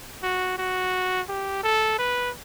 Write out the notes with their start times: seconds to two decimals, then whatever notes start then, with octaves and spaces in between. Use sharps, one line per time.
0.23 F#4
0.58 F#4
1.29 G4
1.63 A4
1.99 B4